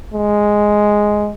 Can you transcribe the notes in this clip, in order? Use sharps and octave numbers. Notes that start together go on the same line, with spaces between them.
G#3